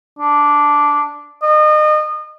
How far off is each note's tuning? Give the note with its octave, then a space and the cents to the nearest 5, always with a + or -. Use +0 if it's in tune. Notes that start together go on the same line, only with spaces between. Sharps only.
D4 -5
D#5 -30